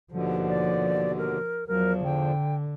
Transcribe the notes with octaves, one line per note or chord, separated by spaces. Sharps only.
D#2 B2 D3 F3
D5
A#4
E2 F3 F#3 A#4
D3 G5